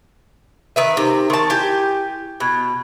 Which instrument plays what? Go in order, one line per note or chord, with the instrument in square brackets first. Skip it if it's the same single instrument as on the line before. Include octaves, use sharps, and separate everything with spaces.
[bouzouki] D#3 B4 E5 [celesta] D#7
[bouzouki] C3 [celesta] D#4 A#4 C5
[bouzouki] D#3 A5 [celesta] A#4 C6 C#6
[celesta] E4 G6 [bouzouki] G4 G#5
[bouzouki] B2 [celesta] B5 F#6 G#6